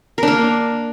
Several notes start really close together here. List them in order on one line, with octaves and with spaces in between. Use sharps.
A#4 D4 A#3